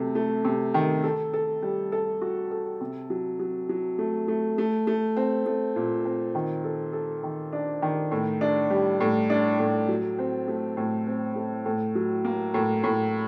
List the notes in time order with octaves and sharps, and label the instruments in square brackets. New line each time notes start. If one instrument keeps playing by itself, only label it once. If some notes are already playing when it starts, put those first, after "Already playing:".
Already playing: [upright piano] C3 F#3 A3
A3
C3
D#3
A4
A4
G3
A4
F#4
A4
C3
F#3
F#3
F#3
A3
A3
A3
A3
C4
A3
A#2
C4
D#3
A4
A4
D#3
D4
D#3
A2
D4
G3
A2
D4
A2
F#3
C4
A3
A2
C4
A3
A2
F#3
A#3
A2
A2